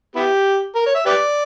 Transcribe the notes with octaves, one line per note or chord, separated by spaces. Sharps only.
B3 E4 G4
A#4
C#5
E5
G4 B4 D5